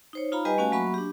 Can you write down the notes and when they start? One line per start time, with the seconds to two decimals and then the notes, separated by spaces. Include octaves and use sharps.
0.13 D#4 C5 C#5
0.32 D#4 F4 F5 A#5 B5
0.45 G3 G4 B4 D#5 G#5
0.58 A3 C#4 F#4 F5 G#5 A5
0.72 F#3 A#3 F#4 E5 B5 C#6
0.94 D4 G4